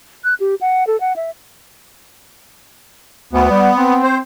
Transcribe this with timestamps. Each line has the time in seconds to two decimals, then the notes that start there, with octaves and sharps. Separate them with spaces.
0.24 F#6
0.40 G4
0.61 F#5
0.87 A4
1.00 F#5
1.16 E5
3.33 D2 B3
3.50 G3
3.76 C4
4.03 C5